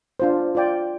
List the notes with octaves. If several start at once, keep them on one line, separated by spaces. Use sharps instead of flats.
D4 F4 C5
F4 D5 G5